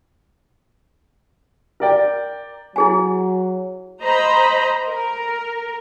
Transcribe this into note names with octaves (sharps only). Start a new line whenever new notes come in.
A#4 D5 G5
F#3 E4 G#4 G#5
C5 D#5 A#5 B5
A#4